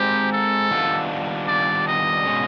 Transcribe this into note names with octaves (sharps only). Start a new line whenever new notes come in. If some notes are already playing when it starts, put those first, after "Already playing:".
Already playing: G#3 C4 D#4 G4 G#4
A4
D#3 G3 B3 D4 F4
D5
D#5
B2 G#3 C#4